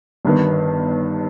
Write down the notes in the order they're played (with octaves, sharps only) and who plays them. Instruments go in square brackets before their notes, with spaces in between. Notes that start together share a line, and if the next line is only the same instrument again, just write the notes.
[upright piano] G1 G2 D#3 B3